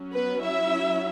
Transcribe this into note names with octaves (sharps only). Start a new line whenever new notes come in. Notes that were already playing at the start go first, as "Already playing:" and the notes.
Already playing: F#3 C#4
B3 B4
E4 E5